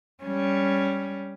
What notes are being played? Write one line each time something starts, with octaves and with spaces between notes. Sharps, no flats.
G3 C#4